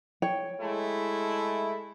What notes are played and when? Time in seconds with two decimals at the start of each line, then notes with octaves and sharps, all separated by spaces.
0.22 C#5 G5
0.61 G#3 A3 E4